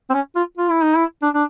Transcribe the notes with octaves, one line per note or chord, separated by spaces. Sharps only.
C4
C#4
F4
F4
E4
D#4
E4
D4
D4